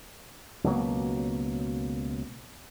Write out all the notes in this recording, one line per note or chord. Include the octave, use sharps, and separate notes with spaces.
C#2 B2 F#3 A#3